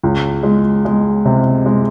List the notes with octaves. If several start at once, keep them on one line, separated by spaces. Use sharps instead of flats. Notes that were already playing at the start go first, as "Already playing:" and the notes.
C#2
G#3
G#3
C3
G#3